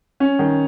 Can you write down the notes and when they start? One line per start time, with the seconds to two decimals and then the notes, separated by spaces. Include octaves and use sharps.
0.20 C#4
0.39 D#3